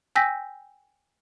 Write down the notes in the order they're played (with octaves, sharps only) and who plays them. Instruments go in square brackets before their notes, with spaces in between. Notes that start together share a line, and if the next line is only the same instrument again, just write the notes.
[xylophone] G5 G#5 E6 G6 A#6 B6